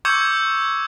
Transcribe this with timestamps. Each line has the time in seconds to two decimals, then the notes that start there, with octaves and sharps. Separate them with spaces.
0.05 C#6 D6 E6 G6 G#6 C#7